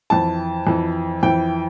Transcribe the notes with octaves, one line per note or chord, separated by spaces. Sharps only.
F2 E3 A5
F2 E3
F2 E3 G5